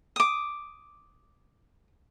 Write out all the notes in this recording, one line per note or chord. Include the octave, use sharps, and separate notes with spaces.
D6 D#6